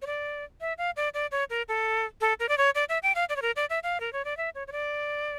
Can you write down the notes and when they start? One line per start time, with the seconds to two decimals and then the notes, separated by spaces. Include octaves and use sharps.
0.02 C#5
0.06 D5
0.61 E5
0.78 F5
0.96 D5
1.14 D5
1.32 C#5
1.50 A#4
1.68 A4
2.21 A4
2.40 A#4
2.49 D5
2.58 C#5
2.75 D5
2.89 E5
3.03 G5
3.15 F5
3.29 D5
3.36 C#5
3.42 A#4
3.56 D5
3.70 E5
3.83 F5
4.00 A#4
4.13 C#5
4.25 D5
4.37 E5
4.55 C#5
4.67 C#5
4.72 D5